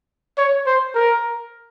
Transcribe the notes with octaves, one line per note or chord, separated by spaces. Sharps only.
C#5
C5
A#4